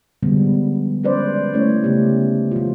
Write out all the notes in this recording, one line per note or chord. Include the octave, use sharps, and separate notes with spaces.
D3 F3 G3 G#3 B3
G#3 C#4 B4 C5 D5
A3 C#4 E4 C#5
C#3 A3 B3 G4
F3 F4